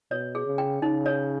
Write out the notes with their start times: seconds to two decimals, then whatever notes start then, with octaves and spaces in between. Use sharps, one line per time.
0.11 B2 C#5
0.35 G#4
0.46 C#3
0.58 G5
0.82 C#3 D#4
1.06 C#5